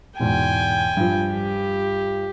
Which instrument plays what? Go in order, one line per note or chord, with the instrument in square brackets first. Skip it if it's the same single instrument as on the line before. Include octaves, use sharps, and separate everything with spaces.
[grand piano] E2 G#2 B2 [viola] G5 G#5
[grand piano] G2 F3
[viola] G4